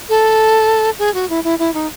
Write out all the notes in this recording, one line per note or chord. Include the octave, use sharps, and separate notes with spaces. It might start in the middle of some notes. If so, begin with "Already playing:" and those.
A4
G#4
F#4
E4
E4
E4
D#4